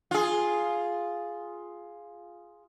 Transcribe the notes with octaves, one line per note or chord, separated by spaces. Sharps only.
F4 G#4